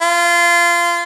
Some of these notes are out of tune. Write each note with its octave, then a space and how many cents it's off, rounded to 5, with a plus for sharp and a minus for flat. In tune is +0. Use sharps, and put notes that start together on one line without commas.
F4 -20